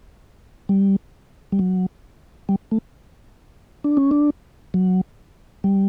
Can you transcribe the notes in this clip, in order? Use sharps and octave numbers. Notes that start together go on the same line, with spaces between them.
G3
G3
F#3
G3
A3
D4
C#4
D4
F#3
G3